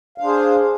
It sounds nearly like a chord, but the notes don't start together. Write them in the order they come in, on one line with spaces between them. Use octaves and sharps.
F5 D4 C5 G#4